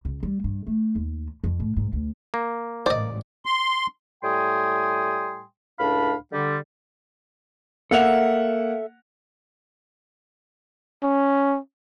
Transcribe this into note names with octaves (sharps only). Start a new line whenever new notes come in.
C#2
G3
G2
A3
D#2
F2
A2
G#2
D2
A#3
A1 G#2 C5 D5 D#5
C6
A2 G3 G5 G#5 C6 D#6
C#2 A2 D4 F5 B5
D3 G3
A#3 A4 E5 F#5 F7
C#4